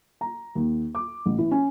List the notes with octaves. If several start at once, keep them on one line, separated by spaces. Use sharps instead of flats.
A#5
D#2
D6
A1
E3
C#4